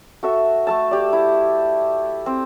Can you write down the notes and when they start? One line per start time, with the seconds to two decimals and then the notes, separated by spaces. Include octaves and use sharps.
0.23 F#4 A4 E5
0.67 A3 A4 A5
0.91 G4 D5
1.13 E4
2.26 C4